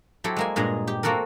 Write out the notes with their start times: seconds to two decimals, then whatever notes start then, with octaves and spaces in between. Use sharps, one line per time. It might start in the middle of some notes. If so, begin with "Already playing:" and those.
0.24 F#3 C4 E4 G4 A4
0.36 G#3 A#3 G#5
0.56 G2 A#2 G#3 G#4 A#5
0.87 G4
1.03 A#3 C4 F#4 A4 A#4